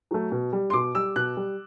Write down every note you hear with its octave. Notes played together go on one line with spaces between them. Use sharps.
F#3 A3
B2
G3
C6
B2 D6
G3 E6
B2 F#6
G3